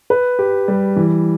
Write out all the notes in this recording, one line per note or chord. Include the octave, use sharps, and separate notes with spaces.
B4
G4
G3
E3